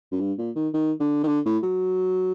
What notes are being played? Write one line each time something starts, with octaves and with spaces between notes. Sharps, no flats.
F#2
G2
A#2
D#3
D#3
D3
D#3
D3
A2
F#3